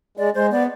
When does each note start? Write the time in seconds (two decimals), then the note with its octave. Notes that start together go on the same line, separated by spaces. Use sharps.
0.17 G#3 D5
0.34 G#3 C5
0.51 B3 D5